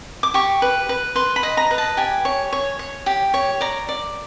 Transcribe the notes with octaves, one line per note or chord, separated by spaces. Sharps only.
D6
G4 C#6
B4
B4
B4 C6
B5
D#5
A#5
B4
A5
G4 G#5
C#5
C#5
C#5
G4
C#5
D5 A#5
D5